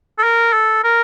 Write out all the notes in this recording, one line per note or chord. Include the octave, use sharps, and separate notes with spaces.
A4
A#4
A4
A#4